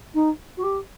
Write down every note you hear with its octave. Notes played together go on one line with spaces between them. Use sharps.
D#4
F#4
G4